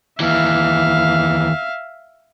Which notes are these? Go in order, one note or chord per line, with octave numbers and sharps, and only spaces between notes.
D#2 E3 E5 F5